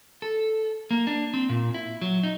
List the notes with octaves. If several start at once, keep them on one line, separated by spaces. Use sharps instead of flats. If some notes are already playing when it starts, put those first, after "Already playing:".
A4
A#3
D4
C4
A#2
E4
F#3
D#4